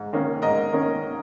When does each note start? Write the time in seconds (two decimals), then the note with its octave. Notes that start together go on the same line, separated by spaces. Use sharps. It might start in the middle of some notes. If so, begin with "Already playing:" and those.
Already playing: G#2
0.13 D#3 A#3 C#4
0.42 G#2 A#4 D#5
0.72 D#3 A#3 C#4